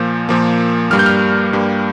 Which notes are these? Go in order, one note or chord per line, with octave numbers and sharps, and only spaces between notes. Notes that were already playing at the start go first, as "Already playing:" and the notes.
Already playing: A#2 F3 A#3 G6
A#2 F3 A#3
G2 G3 A#3 F6
G6
F6
G2 G3 A#3